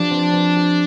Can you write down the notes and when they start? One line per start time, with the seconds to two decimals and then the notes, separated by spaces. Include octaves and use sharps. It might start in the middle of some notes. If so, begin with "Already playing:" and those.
Already playing: F3 D4 G4
0.11 C4
0.33 C4
0.56 G4